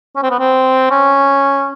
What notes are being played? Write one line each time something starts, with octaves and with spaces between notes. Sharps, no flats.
C#4
C4
B3
C4
C#4